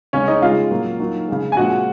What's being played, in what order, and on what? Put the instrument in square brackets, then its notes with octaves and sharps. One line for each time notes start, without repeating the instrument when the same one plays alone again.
[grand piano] C#3 G#3 C#4 C#5
D#4 D#5
C#3 G#3 F4 F5
A#2 F#3 A#3
D#3 F#3 A#3
C#3 G#3
G#5
A#2 F3 G#3 F#4 F#5